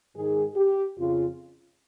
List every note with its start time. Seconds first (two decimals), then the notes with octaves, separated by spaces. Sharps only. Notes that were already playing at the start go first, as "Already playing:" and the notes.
0.14 G#2 D#3 G#4
0.55 G4
0.97 F2 C#3 F4